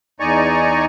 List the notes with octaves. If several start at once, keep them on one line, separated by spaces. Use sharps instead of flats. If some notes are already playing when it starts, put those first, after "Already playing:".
E2 D#4 D5 G#5 A#5 C#6